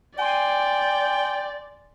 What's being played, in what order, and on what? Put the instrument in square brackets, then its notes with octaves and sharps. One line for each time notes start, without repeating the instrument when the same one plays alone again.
[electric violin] D5 [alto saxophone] G5 [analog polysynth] G#5 C6